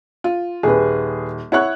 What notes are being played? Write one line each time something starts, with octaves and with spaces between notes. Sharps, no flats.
F4
D#1 G#4 B4
E4 C#5 F#5 C#6 F#6